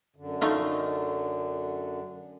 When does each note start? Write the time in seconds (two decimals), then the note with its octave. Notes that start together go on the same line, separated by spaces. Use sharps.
0.16 F#2 D3
0.41 A3 D#4 F4